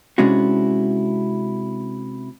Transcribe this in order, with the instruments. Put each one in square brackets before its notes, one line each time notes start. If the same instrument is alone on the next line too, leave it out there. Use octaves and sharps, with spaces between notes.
[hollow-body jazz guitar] C3 G#3 C#4 D4 E4 F#4